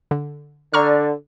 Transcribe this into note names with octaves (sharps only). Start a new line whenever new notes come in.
D3
D3 D5 A#5 C#6 F6